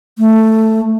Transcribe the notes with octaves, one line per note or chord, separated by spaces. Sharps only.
A3